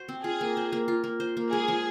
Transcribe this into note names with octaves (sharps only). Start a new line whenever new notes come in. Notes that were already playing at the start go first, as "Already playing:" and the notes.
Already playing: F#4 C5
C4
F4 G#4
A#3
C5
A#3
F4
A#3
C5
A#3
G#3 G#4
F3